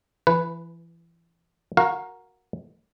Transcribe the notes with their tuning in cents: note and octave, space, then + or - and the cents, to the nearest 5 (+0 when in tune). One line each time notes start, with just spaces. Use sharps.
E3 +30 B4 +0
F#4 -10 A#4 +0 F5 +20